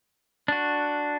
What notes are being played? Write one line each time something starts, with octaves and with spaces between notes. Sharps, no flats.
D4 F#4